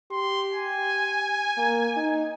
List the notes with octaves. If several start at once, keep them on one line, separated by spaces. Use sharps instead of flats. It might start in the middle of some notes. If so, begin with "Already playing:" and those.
G4 C6
G#5
A#3
D#4